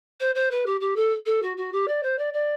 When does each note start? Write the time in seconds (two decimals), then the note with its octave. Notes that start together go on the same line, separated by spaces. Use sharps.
0.20 C5
0.35 C5
0.51 B4
0.66 G4
0.80 G4
0.96 A4
1.26 A4
1.42 F#4
1.57 F#4
1.72 G4
1.87 D5
2.03 C5
2.18 D5
2.33 D5